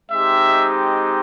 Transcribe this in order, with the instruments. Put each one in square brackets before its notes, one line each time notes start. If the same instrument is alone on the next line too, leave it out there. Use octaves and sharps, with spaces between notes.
[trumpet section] G#3 C4 D#4 G4 E5